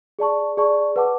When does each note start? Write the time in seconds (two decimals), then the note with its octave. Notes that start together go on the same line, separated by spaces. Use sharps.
0.19 G#4 D5 A5 C#6
0.57 G#4 D5 A5 C#6
0.96 B4 F#5 A5 D6